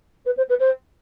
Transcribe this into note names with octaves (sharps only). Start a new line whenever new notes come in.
B4
C5
B4
C5